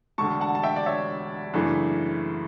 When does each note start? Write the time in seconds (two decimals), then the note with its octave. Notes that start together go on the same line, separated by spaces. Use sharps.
0.18 E1 D2 D3 A5 C#6
0.41 F#5 A5
0.55 A5
0.63 E5 G5
0.76 D5
0.86 C#5 E5
1.54 F#2 C#3 E3 A3 D4